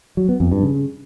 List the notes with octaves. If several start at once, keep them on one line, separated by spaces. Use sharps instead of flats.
F#3
B3
F2
G2
C#3